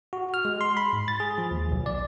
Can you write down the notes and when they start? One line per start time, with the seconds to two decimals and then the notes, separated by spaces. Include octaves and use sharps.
0.13 F#4
0.34 F6
0.45 G#3
0.61 C6
0.77 B5
0.93 G#2
1.08 A6
1.20 G#4
1.38 F3
1.51 D#2
1.71 B1
1.86 D5